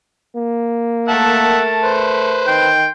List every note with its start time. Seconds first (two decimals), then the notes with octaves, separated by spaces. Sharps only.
0.37 A#3
1.08 A3 A#4 E5 F#5 A5
1.83 B4 C5
2.47 D#3 G5 C6